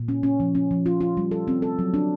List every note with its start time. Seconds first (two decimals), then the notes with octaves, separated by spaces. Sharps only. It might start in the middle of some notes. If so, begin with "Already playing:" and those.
Already playing: A#2
0.08 C#4
0.23 C#4
0.40 F3
0.55 C#4
0.71 F3
0.86 F4
1.01 F4
1.17 G3
1.31 A4
1.48 C4
1.62 A4
1.79 F#3
1.94 D4